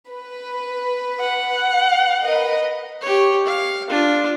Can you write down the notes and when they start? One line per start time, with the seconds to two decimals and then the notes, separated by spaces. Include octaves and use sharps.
0.10 B4
1.20 F#5
2.24 A#4 B4 D#5
3.01 G4 C#5
3.46 F5
3.89 D4 F4